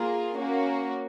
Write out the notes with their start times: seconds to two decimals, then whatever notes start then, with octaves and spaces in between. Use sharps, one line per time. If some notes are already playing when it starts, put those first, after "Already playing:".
Already playing: A#3 F4 G#4
0.36 A#3 C#4 F#4